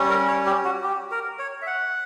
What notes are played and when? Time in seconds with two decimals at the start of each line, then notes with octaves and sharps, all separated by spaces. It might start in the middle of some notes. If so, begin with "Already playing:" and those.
Already playing: G3 C#4
0.10 A#4
0.28 C#5
0.46 G4
0.65 F#4
0.84 G4
1.11 A#4
1.39 C#5
1.62 E5
1.67 F#5